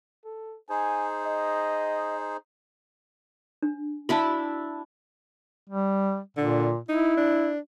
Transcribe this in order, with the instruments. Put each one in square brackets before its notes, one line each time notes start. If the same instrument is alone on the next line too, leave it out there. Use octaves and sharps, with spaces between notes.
[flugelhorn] A4
[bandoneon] D#4 G#4 C5 [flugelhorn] G#5
[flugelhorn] D#5
[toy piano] D4
[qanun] D4 E4 B5 [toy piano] F#4 F5 A5
[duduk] G3
[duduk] A#2 [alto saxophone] D3
[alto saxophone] D#4 [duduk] E4
[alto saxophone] D4